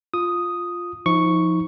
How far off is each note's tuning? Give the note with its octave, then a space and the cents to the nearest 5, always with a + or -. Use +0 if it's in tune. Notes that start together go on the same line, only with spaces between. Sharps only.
F4 +0 D#6 +0
F3 +0 D#4 +30 C#6 +0